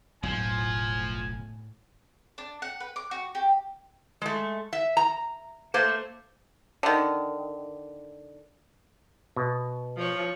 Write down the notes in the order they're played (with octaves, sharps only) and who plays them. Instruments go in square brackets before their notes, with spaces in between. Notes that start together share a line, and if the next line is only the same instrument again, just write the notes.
[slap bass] F#1 B1 E2 [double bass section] A2 [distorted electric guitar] F3 [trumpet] G#5
[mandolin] D4
F#5
B4
D6
F#4
G4
[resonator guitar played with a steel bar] G#3 A3
E5
A#5
A3 A#3 C5
[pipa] D3 D#3
[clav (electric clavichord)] B2
[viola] F3 C#5